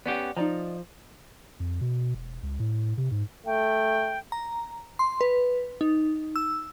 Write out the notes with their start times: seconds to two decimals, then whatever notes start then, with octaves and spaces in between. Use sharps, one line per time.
0.06 B3 C#4 G4 D5 F#5
0.37 F3 D#4 D5 A#5
1.60 F2
1.81 B2
2.14 E1
2.43 C#2
2.59 A2
2.97 C3
3.11 G#2
3.46 A3 G5
4.32 A#5
4.99 C6
5.21 B4
5.81 D#4
6.36 E6